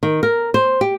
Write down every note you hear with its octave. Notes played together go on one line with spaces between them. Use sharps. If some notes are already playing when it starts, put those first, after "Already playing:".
D#3
A#4
C5
G4